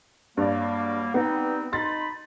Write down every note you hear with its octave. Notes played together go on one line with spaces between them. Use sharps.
G2 F#3 G3 A#3 D5
G3 B3 C4 D#4
D#4 B5 C6 A6